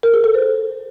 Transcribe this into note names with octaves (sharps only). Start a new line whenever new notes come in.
A#4
G#4
A4
C5